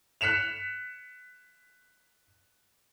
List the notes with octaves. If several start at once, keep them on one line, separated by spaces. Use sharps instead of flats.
F#6 B6 C#7 E7 F7